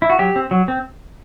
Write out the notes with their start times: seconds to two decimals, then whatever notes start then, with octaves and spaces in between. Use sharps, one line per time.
0.02 E4
0.10 F#4
0.19 F#3 G4
0.36 C4
0.51 F#3
0.68 C4